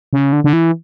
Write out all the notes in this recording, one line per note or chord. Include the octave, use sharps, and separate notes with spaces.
C#3
D3
D3
E3